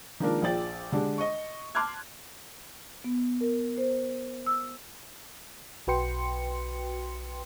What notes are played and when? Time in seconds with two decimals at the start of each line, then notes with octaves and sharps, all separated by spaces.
0.20 D#3 F3 G#3 A#3 D4 A#4
0.42 A#1 F3 G#4 D5 G5 A6
0.92 D3 G#3 D4 G4
1.18 D#5 C#6
1.75 A5 C6 D6 F6 F#6 G#6
3.04 B3
3.41 A#4
3.78 C5
4.47 E6
5.87 B1 F#4 B4 G5 C6 C#7